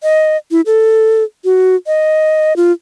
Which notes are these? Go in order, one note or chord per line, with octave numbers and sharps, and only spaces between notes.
D#5
E4
A4
F#4
D#5
F4